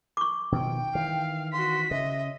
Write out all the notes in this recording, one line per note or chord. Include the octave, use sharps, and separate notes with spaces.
C#6 D6
B2 D#3 F3 G5
D#3 E3 F5
F#4 C6 B6
C#3 D#5 E5